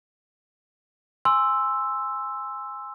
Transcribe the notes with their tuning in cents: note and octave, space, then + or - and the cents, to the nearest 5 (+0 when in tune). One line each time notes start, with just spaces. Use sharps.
G#5 -10 C6 +0 E6 +0